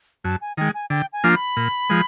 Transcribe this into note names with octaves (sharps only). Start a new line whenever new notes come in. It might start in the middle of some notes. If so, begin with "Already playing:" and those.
F#2 A5
G#5
D#3 G#3 G5
G#5
D3 G5
G#5
F3 A#3 D4 F4
B5
A#2
F3 G#3